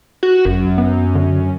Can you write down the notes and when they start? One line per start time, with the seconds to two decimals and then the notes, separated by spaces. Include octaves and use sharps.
0.23 F#4
0.45 G1 F#2
0.78 B3
1.15 D3